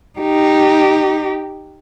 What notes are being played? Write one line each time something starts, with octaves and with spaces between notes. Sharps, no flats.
D#4 G4